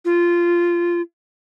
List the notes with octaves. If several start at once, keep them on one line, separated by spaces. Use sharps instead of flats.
F4